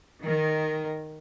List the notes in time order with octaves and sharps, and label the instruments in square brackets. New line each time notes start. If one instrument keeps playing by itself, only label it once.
[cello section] D#3 [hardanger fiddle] A#4